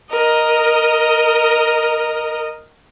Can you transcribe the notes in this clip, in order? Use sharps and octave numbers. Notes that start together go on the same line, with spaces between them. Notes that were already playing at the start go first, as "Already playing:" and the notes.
A#4 D#5